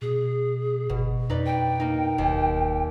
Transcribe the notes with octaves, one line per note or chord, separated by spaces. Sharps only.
B2 G#4
G1 B2
F2 D#4 B4 D5
G5
A#3 D#4
E1 D#2